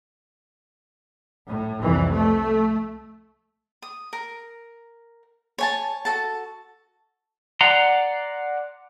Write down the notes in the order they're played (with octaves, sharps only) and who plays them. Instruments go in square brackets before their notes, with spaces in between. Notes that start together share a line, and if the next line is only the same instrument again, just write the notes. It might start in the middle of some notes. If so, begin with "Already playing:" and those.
[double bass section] A2
C2 F2 E3
A3
[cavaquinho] D#6
A#4
C#5 G#5 A5
F#4 A4 A5
[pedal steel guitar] D5 F#5 A#5 C6